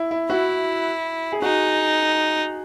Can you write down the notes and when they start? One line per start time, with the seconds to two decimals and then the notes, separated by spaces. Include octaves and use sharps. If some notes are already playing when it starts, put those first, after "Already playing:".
Already playing: E4
0.11 E4
0.30 E4 F#4
1.32 G#4
1.42 D#4 F#4